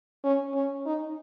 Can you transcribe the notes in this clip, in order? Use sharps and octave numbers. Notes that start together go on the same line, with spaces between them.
C#4
C#4
D#4